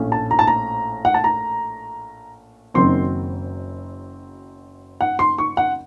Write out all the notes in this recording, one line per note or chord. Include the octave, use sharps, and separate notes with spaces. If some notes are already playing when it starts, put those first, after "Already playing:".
Already playing: A#1 A2 A3 C#4
A5
A#5
A5
A#5
F#5
A5
A#5
F#1 F#2 D#3 F#3 C4 C6
F#5
C6
C#6
F#5